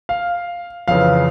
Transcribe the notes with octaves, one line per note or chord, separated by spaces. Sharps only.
F5
F2 C#3 E3 F5